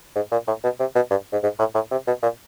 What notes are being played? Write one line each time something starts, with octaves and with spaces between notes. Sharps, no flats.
G#2
A#2
A2
B2
C3
B2
G2
G#2
G#2
A2
A2
C3
B2
A#2